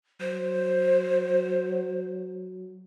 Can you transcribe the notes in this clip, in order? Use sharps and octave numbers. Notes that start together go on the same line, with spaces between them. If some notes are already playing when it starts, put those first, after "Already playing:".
F#3 C5